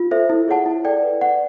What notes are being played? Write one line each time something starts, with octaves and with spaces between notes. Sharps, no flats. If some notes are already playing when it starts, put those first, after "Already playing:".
Already playing: F4
A4 C5 E5
E4
G#4 C#5 F#5 A5
E4
A4 D5 G5
B4
D5 F#5